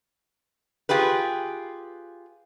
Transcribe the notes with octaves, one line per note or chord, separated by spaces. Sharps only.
F4 G4 G#4 B4